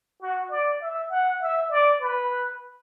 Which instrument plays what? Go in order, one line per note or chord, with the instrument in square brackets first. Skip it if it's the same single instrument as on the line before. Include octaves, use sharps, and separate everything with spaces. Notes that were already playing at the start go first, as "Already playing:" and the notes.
[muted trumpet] F#4
D5
E5
F#5
E5
D5
B4